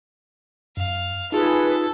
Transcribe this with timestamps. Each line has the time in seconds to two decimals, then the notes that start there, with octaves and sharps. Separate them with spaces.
0.77 F#2 F5
1.32 D#4 F4 G#4 A4 B4